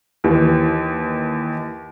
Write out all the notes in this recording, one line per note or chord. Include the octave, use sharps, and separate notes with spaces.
D#2 E3